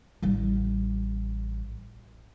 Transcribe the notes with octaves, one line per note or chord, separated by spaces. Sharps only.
A1 G3